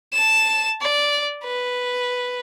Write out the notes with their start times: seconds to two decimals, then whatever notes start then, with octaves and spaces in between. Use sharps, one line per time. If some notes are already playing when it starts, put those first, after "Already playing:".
0.13 A5 E7
0.82 D5
1.44 B4